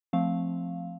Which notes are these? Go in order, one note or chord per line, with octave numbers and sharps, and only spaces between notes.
F3 A3 C4 F5